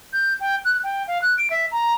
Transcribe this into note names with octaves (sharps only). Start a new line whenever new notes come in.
G6
G5
F#6
G5
F5
F#6
D7
E5
A#5